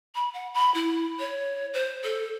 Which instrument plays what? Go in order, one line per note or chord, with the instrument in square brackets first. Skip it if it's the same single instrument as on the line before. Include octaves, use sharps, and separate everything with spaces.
[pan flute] B5
F#5
B5
E4
C#5
C5
A4